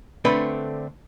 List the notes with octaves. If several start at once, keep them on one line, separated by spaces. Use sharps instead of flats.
D3 A3 C4 D4 B4